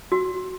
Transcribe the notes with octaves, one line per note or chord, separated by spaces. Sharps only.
F#4